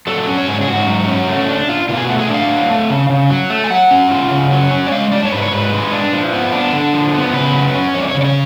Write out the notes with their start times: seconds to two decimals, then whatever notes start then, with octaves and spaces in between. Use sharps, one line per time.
0.07 F#3 A4
0.27 C#4
0.38 C#5
0.48 G#2
0.61 G#4
0.68 G#2 F#4
0.87 F#3
1.08 C#4
1.28 A3
1.48 D4
1.69 F4
1.89 B2 F4
1.97 G#4
2.04 F#4
2.09 A3
2.19 G#4
2.29 D4 F5
2.49 F#3
2.70 A3
2.90 C#3
3.10 C#3
3.30 F#3
3.50 A3
3.64 G#5
3.70 F#3 F#5
3.91 C#4
4.11 F4
4.31 C#3
4.51 F#3
4.71 C#4
4.87 D5
4.92 G#3 F5
5.12 D4 D5
5.25 C#5
5.32 G#2 B4
5.43 C#5
5.52 G#2 B4
5.72 G#3
5.92 D4
6.13 F3
6.33 B3
6.52 D4
6.73 D3
6.93 F3
7.14 B3
7.34 C#3 B4
7.54 F#3
7.74 C#4
7.94 F2 C#5
8.01 D5
8.08 C#5
8.15 C#3
8.21 D5
8.24 C#5